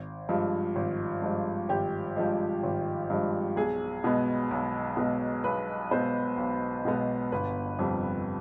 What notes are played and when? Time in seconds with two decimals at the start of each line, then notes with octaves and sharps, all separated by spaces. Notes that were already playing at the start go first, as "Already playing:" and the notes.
Already playing: G#1
0.29 G2 F3 G#3
0.76 G#1
1.22 G2 F3 G#3
1.69 G#1 G4
2.16 G2 F3 G#3
2.63 G#1
3.10 G2 F3 G#3
3.57 B1 G#4
4.04 B2 G#3 B3
4.51 B1
4.97 B2 G#3 B3
5.44 B1 B4
5.91 B2 G#3 B3 C5
6.38 B1
6.85 B2 G#3 B3
7.32 G1 B4
7.79 F2 C3 G3